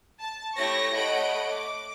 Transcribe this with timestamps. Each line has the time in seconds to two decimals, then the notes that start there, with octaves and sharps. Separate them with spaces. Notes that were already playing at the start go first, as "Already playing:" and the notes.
0.20 A5
0.55 A3 E4 G4 C#5 C#6 A#6
0.95 A3 C#5 D#5 F#5 B5 D7
1.49 D6